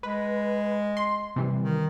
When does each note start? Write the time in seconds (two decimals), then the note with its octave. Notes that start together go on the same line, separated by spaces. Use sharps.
0.03 G#3 B4
0.97 C6
1.36 C3 E3 G3
1.63 D#3